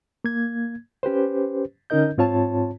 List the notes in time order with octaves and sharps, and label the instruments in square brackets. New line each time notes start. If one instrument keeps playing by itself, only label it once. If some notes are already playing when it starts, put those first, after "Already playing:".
[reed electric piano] A#3 G#6
C#4 G4 B4 C5
D3 C#4 D#4 A#4 D#5 G6
G#2 C4 F4 C#5 A5